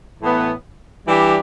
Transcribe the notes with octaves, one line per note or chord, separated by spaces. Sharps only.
A2 E3 B3
E3 G3 D4 G4